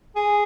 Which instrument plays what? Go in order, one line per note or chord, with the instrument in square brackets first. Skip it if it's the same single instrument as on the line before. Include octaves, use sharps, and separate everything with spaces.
[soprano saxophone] G#4